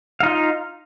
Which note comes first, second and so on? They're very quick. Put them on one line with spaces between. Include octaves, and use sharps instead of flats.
F5 D#4 F4